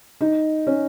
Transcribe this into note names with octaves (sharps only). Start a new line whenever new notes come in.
D#4
C#4